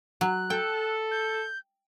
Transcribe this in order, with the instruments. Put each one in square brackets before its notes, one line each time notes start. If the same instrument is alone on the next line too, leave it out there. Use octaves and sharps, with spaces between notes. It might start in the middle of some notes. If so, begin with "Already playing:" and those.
[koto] F#3 [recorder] F#6
[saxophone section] A4 [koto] G5
[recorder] G6